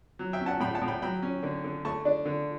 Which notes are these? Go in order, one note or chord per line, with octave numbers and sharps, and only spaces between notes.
F#3
E5 G5
C#4
F#5 A5
A2 G5 B5
F#5 A5
A2
G5 B5
F#3 G5 B5
C#4
D3
D3
A3 A5 C#6
D4
D3